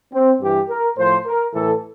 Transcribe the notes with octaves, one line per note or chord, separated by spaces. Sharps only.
C4
G2 E3 G4
A#4
A2 F3 C5
A#4
A2 E3 A4